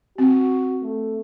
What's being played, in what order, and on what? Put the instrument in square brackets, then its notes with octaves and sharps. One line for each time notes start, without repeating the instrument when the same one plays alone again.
[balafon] C4 [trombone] F#4
[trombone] A3